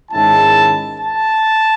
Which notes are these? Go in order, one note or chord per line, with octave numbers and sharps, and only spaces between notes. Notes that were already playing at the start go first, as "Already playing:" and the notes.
G#2 D#3 G#3 C#4 E4 A5
A5